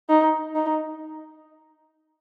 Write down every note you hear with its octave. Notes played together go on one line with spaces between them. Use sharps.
D#4
D#4